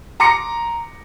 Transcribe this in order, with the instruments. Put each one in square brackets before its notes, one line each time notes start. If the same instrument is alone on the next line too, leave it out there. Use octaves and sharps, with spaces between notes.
[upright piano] A#5 C6 D6 A#6 C#7